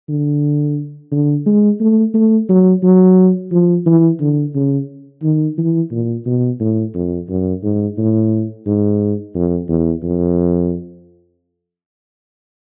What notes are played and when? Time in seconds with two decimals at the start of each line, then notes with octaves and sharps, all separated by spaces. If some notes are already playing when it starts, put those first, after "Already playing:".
0.09 D3
1.12 D3
1.47 G#3
1.80 A3
2.14 A3
2.49 F#3
2.83 F#3
3.52 F3
3.86 E3
4.21 D3
4.55 C#3
5.23 D#3
5.58 E3
5.92 A#2
6.26 B2
6.61 A2
6.95 F2
7.29 F#2
7.63 G#2
7.98 A2
8.66 G#2
9.35 F2
9.69 E2
10.03 F2